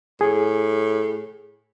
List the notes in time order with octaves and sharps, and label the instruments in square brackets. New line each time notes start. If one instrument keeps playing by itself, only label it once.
[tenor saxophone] A2 [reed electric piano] G#4